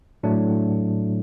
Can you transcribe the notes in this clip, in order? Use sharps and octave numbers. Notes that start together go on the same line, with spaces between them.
A2 F#3 A3 D4